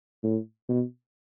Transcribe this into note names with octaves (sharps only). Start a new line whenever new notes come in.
A2
B2